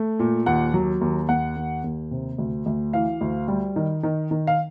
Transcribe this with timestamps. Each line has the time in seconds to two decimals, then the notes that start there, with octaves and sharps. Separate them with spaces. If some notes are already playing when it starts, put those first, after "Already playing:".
Already playing: A3
0.19 A#2
0.46 D#2 F#5
0.74 F#3
1.01 D#2
1.29 D#2 F#5
1.56 D#2
1.84 D#2
2.11 C3
2.38 D2
2.66 D2
2.93 E3 F5
3.21 D2
3.48 G3
3.76 D#3
4.03 D#3
4.31 D#3
4.47 F5